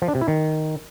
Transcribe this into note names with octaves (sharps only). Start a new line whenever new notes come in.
F3
D4
C3
E4
D#3